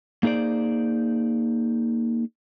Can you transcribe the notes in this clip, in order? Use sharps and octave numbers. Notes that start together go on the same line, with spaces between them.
A#3 D#4 G#4 C5 D5